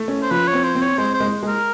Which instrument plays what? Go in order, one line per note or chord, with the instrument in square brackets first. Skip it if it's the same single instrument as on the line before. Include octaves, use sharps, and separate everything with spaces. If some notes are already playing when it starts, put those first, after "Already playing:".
Already playing: [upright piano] A3
C#4
[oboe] C5
[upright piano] F3 [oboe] B4
[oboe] C#5
[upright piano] C4
[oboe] C5
[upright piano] C4
[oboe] C#5
[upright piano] G#3 [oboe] C5
[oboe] C5
[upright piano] G#3
G#3
[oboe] A#4